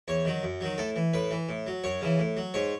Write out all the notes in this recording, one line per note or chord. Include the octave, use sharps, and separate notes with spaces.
E2 C#5
D#3 F#3
F#2
D#3 F#3
A2 A4
E3
A2 B4
E3
A2
F#3
F#2 C#5
C#3 E3
A2
F#3
G#2 C#5